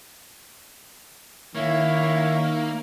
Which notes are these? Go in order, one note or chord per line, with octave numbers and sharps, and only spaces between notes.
D#3 A#3 C#4 E4 C#5